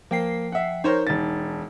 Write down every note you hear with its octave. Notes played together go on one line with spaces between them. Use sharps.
F3 A#3 G5 C7
E5 F#5
D#4 A#4 C5 C#5
E1 A6